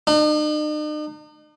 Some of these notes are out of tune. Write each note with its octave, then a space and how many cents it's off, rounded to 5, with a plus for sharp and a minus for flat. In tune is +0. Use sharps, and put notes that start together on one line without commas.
D#4 -45